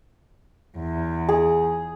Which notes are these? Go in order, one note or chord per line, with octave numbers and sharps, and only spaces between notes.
E2
G#4